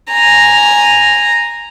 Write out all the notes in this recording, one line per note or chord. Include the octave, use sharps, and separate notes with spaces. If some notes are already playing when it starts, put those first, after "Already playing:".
G#5 A#5